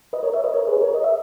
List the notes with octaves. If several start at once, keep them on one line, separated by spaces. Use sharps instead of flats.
B4 D#5
A#4 C#5
C#5 E5
B4 D#5
A#4 C#5
G#4 B4
A#4 C#5
D#5
E5